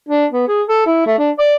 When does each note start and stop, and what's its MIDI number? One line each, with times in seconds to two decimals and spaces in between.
0.09 0.26 62
0.32 0.47 59
0.48 0.62 68
0.68 0.83 69
0.87 1.04 64
1.07 1.17 57
1.18 1.31 62
1.39 1.55 74